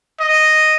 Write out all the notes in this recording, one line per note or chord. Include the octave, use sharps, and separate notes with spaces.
D#5